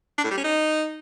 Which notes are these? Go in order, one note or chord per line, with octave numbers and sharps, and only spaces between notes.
D4
A2
G3
C#4
D#4